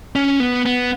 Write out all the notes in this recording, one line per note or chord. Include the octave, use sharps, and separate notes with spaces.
C#4
B3
B3